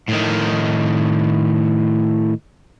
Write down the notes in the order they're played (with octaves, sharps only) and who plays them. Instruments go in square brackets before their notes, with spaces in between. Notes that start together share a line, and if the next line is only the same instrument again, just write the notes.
[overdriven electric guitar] A2 D#3